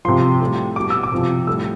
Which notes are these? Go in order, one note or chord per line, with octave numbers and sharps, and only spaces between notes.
C3 F3 C6
A2 G3
B2 G3 D6
E6
D6
C3 F3
A2 G3 E6